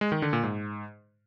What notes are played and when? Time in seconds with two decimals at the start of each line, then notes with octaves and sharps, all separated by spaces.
0.01 G#3
0.12 D#3
0.22 D3
0.33 A#2
0.43 G#2